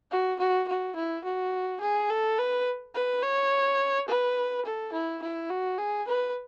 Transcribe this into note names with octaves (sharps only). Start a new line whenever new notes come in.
F#4
F#4
F#4
E4
F#4
G#4
A4
B4
B4
C#5
B4
A4
E4
E4
F#4
G#4
B4